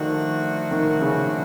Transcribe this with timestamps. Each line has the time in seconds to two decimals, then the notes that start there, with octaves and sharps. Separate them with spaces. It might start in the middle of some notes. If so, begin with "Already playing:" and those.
Already playing: D#3 F3 A3 D4 F#4
0.71 D#3
1.01 C#3